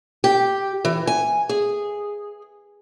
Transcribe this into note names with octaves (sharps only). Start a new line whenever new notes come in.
G4
E3
G#5
G#4